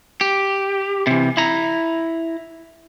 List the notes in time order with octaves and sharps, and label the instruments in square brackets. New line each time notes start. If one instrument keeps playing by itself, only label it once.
[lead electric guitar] G4
C3 E3
E4 A#5